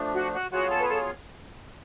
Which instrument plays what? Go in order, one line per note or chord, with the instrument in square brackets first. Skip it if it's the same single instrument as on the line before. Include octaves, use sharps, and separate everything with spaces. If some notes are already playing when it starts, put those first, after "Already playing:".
Already playing: [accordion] F3 A3 D4
[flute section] F#4
F#4
[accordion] F#3 B3 F4 G#4 C#5 [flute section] F#4
[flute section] A4
B4
A4